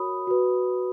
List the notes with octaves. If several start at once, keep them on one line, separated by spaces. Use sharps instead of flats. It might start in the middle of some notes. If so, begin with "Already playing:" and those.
Already playing: F#4 A#4 C#5 B5 D#6
F#4 B4